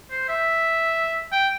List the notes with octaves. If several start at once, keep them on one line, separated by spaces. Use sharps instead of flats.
C5
E5
G5